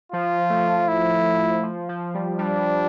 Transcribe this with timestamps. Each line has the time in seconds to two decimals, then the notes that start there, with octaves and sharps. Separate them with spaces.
0.13 F3 F4
0.50 A3
0.88 E4
1.63 F3
1.89 F3
2.14 G3
2.39 G3 D4